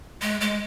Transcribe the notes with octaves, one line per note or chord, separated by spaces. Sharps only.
G#3
G#3